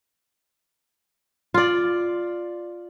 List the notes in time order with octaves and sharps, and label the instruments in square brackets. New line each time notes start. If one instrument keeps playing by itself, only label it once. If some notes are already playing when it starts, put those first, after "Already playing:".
[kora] F4 D5